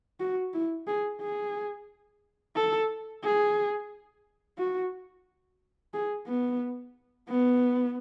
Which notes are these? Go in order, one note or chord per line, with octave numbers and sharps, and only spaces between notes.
F#4
E4
G#4
G#4
A4
G#4
F#4
G#4
B3
B3